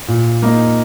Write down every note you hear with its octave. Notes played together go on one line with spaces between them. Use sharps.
A#2
A#3 D#4